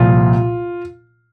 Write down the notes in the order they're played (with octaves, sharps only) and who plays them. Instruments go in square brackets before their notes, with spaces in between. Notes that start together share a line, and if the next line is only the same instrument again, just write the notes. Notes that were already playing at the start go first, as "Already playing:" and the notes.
Already playing: [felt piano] C2 A#2 F3 F4